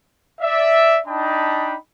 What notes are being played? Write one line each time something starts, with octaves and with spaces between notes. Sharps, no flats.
D5 E5
D4 D#4 D#5 G5 A5 B5